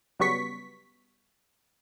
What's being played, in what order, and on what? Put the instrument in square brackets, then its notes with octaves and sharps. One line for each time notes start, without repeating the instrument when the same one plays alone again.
[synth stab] C#3 F#3 G3 B3 C#6 B6